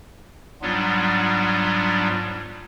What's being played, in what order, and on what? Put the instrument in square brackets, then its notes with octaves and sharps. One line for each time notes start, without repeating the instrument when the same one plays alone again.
[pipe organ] G#2 F#3 G3 B3 D4 F4